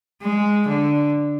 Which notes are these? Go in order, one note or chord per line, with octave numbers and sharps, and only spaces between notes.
G#3
D3